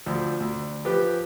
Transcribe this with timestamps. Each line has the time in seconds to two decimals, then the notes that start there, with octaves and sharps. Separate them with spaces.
0.06 D2 F3
0.40 D2
0.85 F3 G4 B4